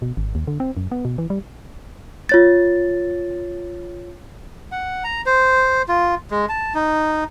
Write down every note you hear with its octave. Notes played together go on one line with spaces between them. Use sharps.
B2
G#1
D#2
D3
C4
F#2
B3
B2
E3
G3
F4 C#5 A6
F#5
A#5
C5
F4
G#3
A5
D#4